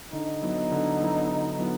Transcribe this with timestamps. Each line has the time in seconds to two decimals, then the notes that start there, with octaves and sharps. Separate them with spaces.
0.13 D3 D#4
0.42 F#3 B3 E4
0.72 D3
1.01 F#3 B3 E4
1.30 D3
1.59 F#3 B3 E4